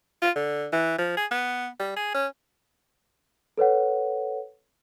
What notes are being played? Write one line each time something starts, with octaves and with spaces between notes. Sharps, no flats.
F4
D3
E3
F3
G#4
B3
G3
G#4
C#4
A4 B4 C#5 F#5